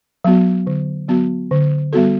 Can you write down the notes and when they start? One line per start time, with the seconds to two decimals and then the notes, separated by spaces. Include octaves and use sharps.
0.24 F#3 B3 F#4
0.67 D3
1.08 F#3 B3 F#4
1.51 D3
1.93 G3 B3 F#4 A4